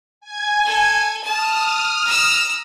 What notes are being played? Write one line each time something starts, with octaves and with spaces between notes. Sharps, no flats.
G#5 G#6
A4
A5 D#6 F6
A#5 E6